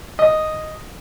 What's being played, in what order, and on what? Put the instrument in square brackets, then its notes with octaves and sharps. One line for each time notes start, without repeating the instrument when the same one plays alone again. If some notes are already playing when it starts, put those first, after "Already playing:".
[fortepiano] D#5